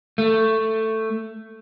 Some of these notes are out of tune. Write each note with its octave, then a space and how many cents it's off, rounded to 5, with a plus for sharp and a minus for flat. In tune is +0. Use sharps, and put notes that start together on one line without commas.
A3 +10